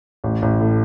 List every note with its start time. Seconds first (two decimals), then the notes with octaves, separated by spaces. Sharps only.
0.24 A1
0.42 A1
0.60 A2